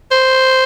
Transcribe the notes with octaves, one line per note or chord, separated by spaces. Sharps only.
C5